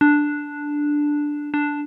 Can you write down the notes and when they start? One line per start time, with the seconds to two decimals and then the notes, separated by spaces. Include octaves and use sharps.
0.01 D4
1.54 D4